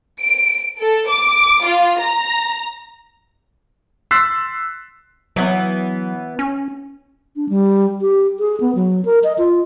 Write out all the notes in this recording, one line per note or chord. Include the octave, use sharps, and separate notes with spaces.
D7
A4
D6
F4
A#5
C6 E6 F#6 A6 B6 C7
E3 F#3 B3
C#4
D4
G3
G4
G#4
B3
F#3
A#4
D#5
F4